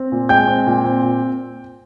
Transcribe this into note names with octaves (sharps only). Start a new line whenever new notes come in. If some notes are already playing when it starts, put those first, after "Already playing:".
Already playing: C4
A#2
G#3 G5 G6
C4
A#2
C4
A#2